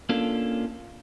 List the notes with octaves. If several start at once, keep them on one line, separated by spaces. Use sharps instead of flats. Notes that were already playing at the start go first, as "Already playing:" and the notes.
A#3 C#4 D4 F4 A4